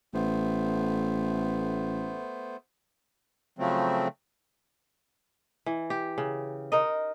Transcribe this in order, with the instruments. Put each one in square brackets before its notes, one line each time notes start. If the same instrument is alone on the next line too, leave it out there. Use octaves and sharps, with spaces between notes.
[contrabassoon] A1 [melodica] A3 B3 C5
[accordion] C#3 F3 F#3 A3 C4
[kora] E3
G4
C#3
D#4 A#4 D#5